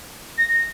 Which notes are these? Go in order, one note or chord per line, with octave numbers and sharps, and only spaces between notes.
A#6